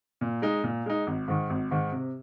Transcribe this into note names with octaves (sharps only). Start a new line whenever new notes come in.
A#2
G#3 D#4
A#2
G#3 D#4
G#1
G#2 D#3
G#1
G#2 D#3
C3